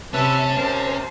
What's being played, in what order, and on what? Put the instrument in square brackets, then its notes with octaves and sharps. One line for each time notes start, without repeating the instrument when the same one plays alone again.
[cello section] C3 [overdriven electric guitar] C#4 [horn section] B4 E5 [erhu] A5
[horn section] C3 A#4 [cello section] C5